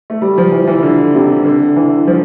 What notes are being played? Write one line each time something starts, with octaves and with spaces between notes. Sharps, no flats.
A3
G3
F3
E3
E3
D3
C3
D3
E3
F3